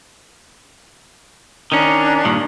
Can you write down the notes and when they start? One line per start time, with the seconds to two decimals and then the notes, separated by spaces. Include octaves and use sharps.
1.72 D#3 C#4 D4 A#5
2.25 G2 A#2 D#3